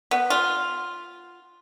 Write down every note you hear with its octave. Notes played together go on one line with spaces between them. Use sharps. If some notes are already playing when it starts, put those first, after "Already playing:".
B3
F4